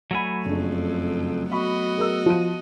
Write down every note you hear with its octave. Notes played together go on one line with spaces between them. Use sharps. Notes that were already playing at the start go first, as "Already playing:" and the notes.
F#3 A3 F#5 G#5 B5
F#1 F2 C#3 D4
B3 F#4 D#5 B5 C#6
G#4 A#4 E6
F3 D#7